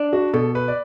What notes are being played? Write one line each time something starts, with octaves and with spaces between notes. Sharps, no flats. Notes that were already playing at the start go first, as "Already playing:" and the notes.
Already playing: D4
F#4
B2 A4
B4
D5